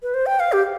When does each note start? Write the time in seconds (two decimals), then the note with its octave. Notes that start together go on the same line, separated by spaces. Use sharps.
0.03 B4
0.14 C5
0.26 G5
0.40 F5
0.52 G4